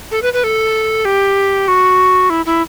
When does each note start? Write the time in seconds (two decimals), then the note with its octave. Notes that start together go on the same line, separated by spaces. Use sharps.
0.11 A4
0.22 B4
0.33 B4
0.44 A4
1.05 G4
1.68 F#4
2.30 E4
2.46 E4